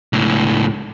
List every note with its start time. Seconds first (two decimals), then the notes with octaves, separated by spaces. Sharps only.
0.13 C#2 A2